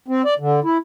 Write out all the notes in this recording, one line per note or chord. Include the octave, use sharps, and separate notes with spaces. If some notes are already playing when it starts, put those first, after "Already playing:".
C4
D5
D3
E4